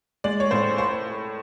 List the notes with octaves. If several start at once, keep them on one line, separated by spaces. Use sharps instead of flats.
G#3 D5
C#5
A2 C5
C5